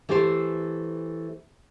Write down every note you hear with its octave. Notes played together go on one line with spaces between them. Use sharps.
E3 A3 G4 A4 C5